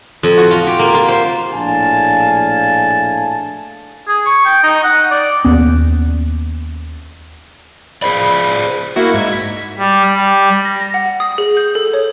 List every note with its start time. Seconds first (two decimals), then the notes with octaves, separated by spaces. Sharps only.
0.23 F2
0.37 F#4
0.51 F4
0.67 G4
0.79 A#3
0.95 F4
1.08 C5
1.53 A#1 A2 D4 F5 G#5 A5
4.08 G#4
4.26 C#6
4.45 G5
4.64 D#4
4.84 F#5
5.11 D5
5.45 D#2 A#3 B3 C#4
8.02 G#4 C5 D5 B5
8.96 A#3 E4 F#4
9.14 G#2 G#6
9.33 B6
9.78 G3
10.14 G3
10.65 A#6
10.80 A#6
10.94 F#5
11.20 D#6
11.38 G#4
11.57 G6
11.75 A4
11.93 C#5